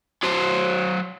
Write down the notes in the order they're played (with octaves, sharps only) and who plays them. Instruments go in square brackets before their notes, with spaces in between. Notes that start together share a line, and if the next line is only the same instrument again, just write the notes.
[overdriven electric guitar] F#3 C5